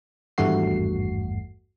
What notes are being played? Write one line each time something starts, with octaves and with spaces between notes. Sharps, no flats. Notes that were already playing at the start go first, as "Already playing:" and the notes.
G#1 E2 G2 A3 F#4 C7